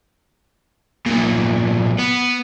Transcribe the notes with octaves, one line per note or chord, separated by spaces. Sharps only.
B1 A#2
B3